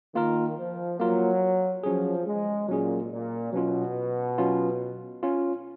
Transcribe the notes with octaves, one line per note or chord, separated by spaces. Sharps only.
D#3 A#3 F4 A#4
F3
F#3 A#3 F4 A#4
F3 F#3 C#4 G#4
G#3
A#2 F#3 C#4 G#4
A#2
B2 F#3 C#4 F4
F#3 C#4 F4
C#4 F4